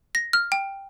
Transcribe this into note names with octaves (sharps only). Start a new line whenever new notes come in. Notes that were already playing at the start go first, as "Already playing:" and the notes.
A#6
F6
G5